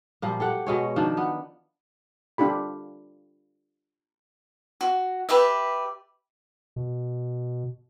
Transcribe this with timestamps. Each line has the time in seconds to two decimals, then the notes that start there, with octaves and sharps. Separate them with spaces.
0.22 A#2 F3 G3
0.40 G4 A4 F#5
0.66 B2 G#3 C#5
0.96 D#3 F3 D4
1.17 B3
2.38 D4 F4 G4 B5
4.81 F#4
5.29 G4 B4 D5 E5
6.76 B2